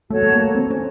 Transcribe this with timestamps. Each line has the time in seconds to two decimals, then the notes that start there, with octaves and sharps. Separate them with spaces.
0.10 A3 F#4 A4 C#5 A5
0.23 A3
0.32 A#3
0.55 C4
0.70 C#4